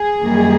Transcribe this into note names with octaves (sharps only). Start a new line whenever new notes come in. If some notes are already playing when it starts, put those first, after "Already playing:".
Already playing: G#4
F#2 D#3 G3 A#3